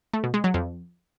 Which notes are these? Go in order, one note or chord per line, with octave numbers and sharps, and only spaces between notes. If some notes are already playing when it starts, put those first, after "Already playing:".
A3
B2
G#3
F#3
F2